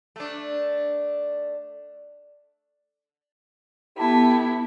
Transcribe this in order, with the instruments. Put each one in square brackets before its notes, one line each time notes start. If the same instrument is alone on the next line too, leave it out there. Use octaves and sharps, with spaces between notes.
[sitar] A3 D4
[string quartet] B3 E4 [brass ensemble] G4 A4 A5